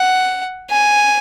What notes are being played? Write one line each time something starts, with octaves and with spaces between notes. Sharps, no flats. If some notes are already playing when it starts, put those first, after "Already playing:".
Already playing: F#5
G#5